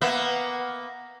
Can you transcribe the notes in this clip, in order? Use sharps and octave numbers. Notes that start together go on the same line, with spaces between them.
A#3 B3 E5